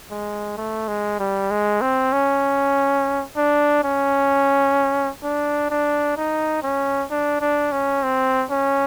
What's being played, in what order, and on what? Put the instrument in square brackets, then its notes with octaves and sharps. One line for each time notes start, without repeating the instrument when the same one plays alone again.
[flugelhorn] G#3
A3
G#3
G3
G#3
C4
C#4
D4
C#4
D4
D4
D#4
C#4
D4
D4
C#4
C4
C#4